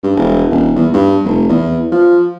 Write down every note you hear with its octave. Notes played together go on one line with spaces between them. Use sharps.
G2
E1
D#1
E2
G2
F1
E2
F3